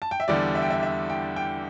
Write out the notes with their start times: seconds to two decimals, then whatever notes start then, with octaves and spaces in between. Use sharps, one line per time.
0.02 A5
0.11 G5
0.20 E5
0.28 E2 D3 G3 D5
0.55 E5
0.62 G5
0.70 E5
0.83 E5
1.10 G5
1.36 G5